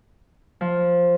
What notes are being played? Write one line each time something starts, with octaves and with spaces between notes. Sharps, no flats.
F3